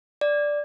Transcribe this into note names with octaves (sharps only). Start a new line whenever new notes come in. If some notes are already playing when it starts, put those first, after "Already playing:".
D5